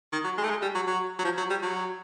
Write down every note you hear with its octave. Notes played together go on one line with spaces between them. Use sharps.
D#3
F#3
G#3
A3
G#3
G3
F#3
F#3
F#3
F3
F#3
G3
F#3